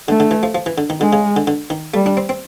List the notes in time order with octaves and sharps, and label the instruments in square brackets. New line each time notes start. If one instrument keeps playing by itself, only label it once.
[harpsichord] D3 [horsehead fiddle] A3
[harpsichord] D3
E3
F3
F3
E3
D3
D#3
[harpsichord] D3 [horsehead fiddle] G#3
[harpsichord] C#3
D3
D3
D#3
[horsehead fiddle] G3 [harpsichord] A3
[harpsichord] D4
C4
C4